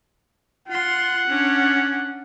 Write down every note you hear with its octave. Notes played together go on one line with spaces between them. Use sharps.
F4 F#5 C6
C#4 D4